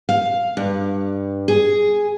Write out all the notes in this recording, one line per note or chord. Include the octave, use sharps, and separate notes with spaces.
F5
G2
G#4